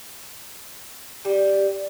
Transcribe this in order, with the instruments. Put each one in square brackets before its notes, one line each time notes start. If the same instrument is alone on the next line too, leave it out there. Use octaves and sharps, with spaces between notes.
[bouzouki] G3